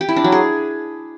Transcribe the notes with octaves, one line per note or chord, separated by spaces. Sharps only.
G4
E4
D4
F#3
G#4